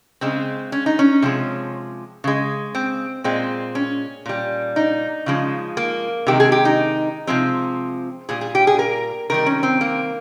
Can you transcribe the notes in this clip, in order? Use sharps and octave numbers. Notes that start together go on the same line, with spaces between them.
C#3 G#3 C4
C#4
D#4
C#4
C3 F3 G#3
C#3 G#3
C4
A#2 G#3 C4
C#4
A#2 G3
D#4
C#3 F3 G#3
A#3
C3 D#3 G#3 G4
G#4
G4
D#4
C3 F3 G#3 C4
A#2 G3 G#4
G#4
G4
G#4
A#4
C3 D#3 G3 A#4
C#4
C4
A#3